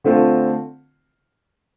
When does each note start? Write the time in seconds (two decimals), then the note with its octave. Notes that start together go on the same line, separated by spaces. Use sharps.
0.04 D3 A3 C4 F4